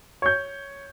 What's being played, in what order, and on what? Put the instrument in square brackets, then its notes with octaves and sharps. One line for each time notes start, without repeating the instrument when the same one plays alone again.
[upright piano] C#5 G6